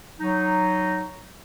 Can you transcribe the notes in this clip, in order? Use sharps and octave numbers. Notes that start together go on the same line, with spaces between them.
F#3 D#4